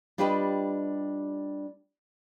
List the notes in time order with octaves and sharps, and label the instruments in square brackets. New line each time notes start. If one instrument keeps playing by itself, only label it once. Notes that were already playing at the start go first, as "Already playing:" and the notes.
[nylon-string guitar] G3 D4 F4 G4 B4 D#5